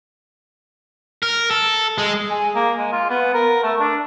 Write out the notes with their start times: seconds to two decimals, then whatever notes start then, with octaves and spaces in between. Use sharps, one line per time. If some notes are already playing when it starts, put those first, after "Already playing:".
1.23 A#4
1.51 A4
1.98 G#3
2.31 G#4
2.55 A#3
2.79 G#3
2.92 F4
3.10 B3
3.34 A#4
3.63 A3
3.80 D4